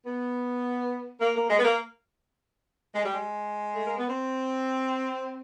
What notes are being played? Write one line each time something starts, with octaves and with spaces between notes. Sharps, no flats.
B3
A#3
A#3
G#3
B3
A#3
G#3
G3
G#3
A3
A#3
B3
C4